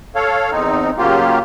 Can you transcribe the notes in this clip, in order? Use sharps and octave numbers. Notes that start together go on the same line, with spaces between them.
A4 C#5 F5
E2 C4 D#4
C#3 F#3 A#3 F4 G4